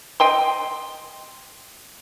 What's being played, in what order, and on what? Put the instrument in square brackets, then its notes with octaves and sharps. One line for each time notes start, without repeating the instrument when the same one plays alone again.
[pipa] D#5 G5 C6